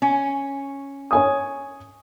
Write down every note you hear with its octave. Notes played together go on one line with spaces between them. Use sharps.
C#4
C#5 G#5 D#6